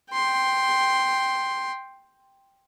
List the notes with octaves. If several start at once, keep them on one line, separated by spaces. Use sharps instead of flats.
G5 C6